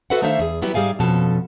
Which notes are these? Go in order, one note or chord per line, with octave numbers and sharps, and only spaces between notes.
F#4 A4 B4 C5 E5 F#5
D#3 A3 D4 C5 E5 F5
E2 G#4
F#3 G3 B3 E4 F#4 G4
G#2 G3 G#4 F5 G#5
F2 B2 F3 C#4 A4 A5